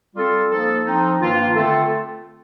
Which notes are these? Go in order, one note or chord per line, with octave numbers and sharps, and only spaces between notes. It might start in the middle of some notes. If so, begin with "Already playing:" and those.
G3 C4 F4 A4
F3 A#3 D#4 A4
F3 C4 D#4
G2 D#3 A#3 D4 F4
D3 A3 C4 F4 A4